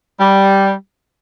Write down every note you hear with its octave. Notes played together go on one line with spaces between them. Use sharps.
G3